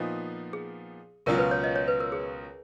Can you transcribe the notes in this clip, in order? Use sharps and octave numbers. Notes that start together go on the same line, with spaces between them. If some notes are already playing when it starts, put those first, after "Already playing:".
Already playing: A#2 F3 B3 D#4
G#4
C#2 B2 F#3 C#4 F4 A#4
B4
C#5
D#5
C#5
B4
A#4
G#4